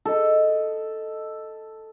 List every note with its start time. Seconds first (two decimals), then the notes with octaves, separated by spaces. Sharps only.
0.05 A4 D#5